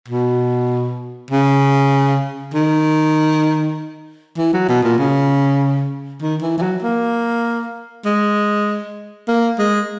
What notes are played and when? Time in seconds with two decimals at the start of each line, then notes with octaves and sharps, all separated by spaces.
0.08 B2
1.31 C#3
2.54 D#3
4.38 E3
4.53 F#3
4.69 B2
4.84 A#2
4.99 C#3
6.22 D#3
6.42 E3
6.58 E3
6.63 F#3
6.82 A#3
8.05 G#3
9.28 A#3
9.59 G#3